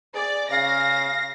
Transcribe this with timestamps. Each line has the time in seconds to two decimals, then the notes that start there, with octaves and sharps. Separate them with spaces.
0.15 G#4 D5
0.51 C#3 F5 A#6